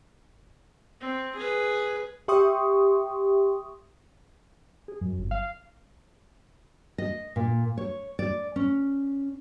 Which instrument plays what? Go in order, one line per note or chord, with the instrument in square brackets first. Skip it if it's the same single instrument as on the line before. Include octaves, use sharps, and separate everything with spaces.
[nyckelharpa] C4
G#4 B4
[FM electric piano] G4 E5 G5 C6 C#6 D#6
[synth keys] G#4
F#2
G1
F5
[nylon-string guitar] D#5
A#2
C#5
D5
C#4